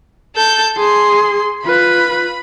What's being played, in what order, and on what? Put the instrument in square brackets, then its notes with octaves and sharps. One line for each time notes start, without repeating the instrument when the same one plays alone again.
[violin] A4 G6
[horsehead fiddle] G#4 [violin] C6
[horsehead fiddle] F4 B4 [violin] B5